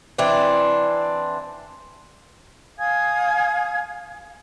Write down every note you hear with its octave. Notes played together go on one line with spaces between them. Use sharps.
E3 C4 D4
F5 G#5 D#6 G#6